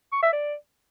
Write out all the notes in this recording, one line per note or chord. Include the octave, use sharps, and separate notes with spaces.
C#6
E5
D5